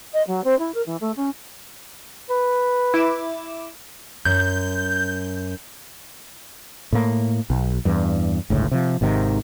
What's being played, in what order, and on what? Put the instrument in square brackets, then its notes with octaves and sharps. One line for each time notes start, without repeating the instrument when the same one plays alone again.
[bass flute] D#5
F#3
C4
E4
A#4
E3
A3
C#4
[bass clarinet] B4
[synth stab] E4 D6 E7
[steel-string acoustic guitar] F#2 [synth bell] G6
[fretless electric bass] A2 A#3
B1
E2 G2
G1 C#2 A2
C3 F3
G#1 G#2 C3 D#3